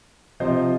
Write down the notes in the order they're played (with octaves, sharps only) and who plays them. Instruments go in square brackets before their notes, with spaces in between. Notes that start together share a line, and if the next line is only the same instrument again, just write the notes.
[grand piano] C3 F3 C4 F4 C5 D#5